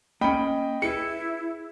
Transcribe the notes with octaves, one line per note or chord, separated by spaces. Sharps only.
A#3 C#4 D#5 G5 B5
E4 G#4 A4 B4 C#7